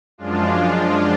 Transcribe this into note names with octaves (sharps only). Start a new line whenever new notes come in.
F#2 F3 G#3 D4 F4